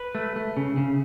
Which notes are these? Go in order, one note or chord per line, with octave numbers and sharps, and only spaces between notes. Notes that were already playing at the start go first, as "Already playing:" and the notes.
Already playing: B4
A3
A3
C#3
C#3